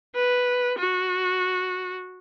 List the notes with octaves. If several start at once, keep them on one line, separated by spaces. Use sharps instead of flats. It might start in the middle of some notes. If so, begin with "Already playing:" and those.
B4
F#4